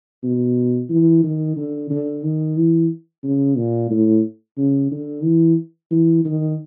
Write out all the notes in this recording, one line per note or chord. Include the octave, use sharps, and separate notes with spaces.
B2
E3
D#3
D3
D3
D#3
E3
C#3
A#2
A2
C#3
D3
E3
E3
D#3